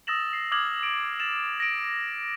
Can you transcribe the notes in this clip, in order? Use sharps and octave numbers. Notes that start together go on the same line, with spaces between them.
D#6 E6 A6 A#6 E7 F#7
C7
D6 D#6 F6 G#6 F#7
A6 D7
A6 E7 F7
A#6 D7